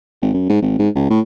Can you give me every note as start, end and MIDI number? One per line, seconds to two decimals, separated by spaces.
0.22 0.33 32
0.34 0.44 42
0.49 0.61 44
0.62 0.77 32
0.79 0.89 44
0.95 1.06 37
1.10 1.21 45